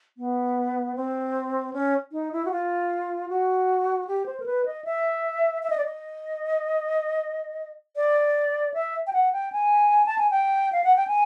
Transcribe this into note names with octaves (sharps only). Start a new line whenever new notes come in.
B3
C4
C#4
D#4
E4
F#4
F4
F#4
G4
C5
A#4
B4
D#5
E5
E5
D#5
D5
D#5
D5
E5
G5
F#5
G5
G#5
A5
G#5
G5
F5
F#5
G5
G#5